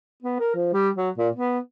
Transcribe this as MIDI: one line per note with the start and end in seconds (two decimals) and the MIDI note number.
0.23 0.38 59
0.40 0.52 70
0.55 0.71 53
0.73 0.90 55
0.97 1.10 54
1.18 1.29 46
1.35 1.59 59